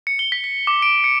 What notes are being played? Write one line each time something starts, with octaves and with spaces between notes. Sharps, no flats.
C#7
G7
B6
B6
D6
D7
C#7